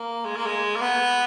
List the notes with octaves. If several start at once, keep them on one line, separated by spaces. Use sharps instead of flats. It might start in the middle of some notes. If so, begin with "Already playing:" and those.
Already playing: A#3
G#3
A#3
G#3
A#3
B3